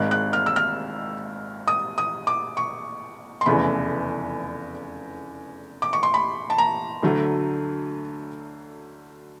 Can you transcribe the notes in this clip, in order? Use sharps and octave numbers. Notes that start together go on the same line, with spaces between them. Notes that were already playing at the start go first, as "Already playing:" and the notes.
Already playing: G#1 G#2 D#3 F#6
F#6
F6
E6
F6
D#6
D#6
D6
C#6
C6
F1 E2 C#3 E3 A3 B5
D6
C#6
C6
B5
A5
A#5
D2 D3 F#3 A3